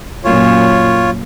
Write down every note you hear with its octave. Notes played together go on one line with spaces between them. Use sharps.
F#2 A#2 F4 C#5